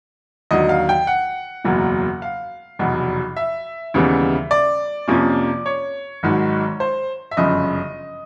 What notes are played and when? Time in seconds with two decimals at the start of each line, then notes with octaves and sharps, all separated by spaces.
0.51 D#2 D3 F#3 D#5
0.69 F5
0.89 G5
1.07 F#5
1.64 F#1 E2 B2 F#3 A#3
2.22 F5
2.79 F1 E2 B2 F#3
3.37 E5
3.94 D#2 C#3 E3 G3 B3
4.51 D5
5.08 F2 C3 F3 A#3 C#4
5.66 C#5
6.23 G#1 G#2 D#3 F#3
6.80 C5
7.31 E5
7.37 G1 F#2 C#3 F3 D#5